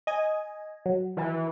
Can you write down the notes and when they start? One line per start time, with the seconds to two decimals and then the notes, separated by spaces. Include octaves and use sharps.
0.07 D#5 G#5
0.86 F#3
1.17 E3